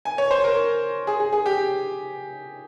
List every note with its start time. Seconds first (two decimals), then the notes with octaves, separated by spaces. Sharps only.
0.05 G#5
0.18 C#5
0.31 C5
0.44 A#4
1.07 G#4
1.20 G#4
1.33 G#4
1.46 G4